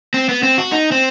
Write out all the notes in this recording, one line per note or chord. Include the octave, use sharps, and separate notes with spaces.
C4
B3
C4
F#4
D#4
C4